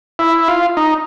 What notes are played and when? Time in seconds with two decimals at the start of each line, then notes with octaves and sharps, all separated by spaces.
0.19 E4
0.48 F4
0.77 D#4